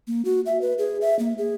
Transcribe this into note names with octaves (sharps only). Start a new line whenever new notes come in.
A#3
F#4
E5
B4
G#4
E5
A#3
G#4